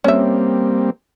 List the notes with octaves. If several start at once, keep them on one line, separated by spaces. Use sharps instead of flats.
G3 A#3 C4 C#4 E5